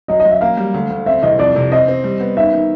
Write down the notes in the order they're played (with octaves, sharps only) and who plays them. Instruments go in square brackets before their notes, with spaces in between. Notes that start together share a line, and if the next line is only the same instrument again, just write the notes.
[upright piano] F#3 [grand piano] D#5
[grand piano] D#5
[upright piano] F#3
[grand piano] E5
[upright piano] A#3 [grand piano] F5
[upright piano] G3
D2
D2
[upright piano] C4 [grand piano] E5
[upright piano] C2 [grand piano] D#5
[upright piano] F2 [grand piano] D5
[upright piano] C3
[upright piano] C4 [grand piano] D#5
[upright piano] C4
G3
B3
[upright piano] D#3 [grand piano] E5
[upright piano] D#3